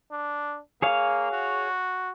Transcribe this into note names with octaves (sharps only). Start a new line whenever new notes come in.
D4
A#3 G#4 C#5 F5
F#4